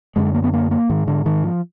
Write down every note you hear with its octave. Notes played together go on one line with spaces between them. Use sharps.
F#2 D3 G#3
A#3
B3
A#3
A#3
G#2 D#3
D3
D#3
F3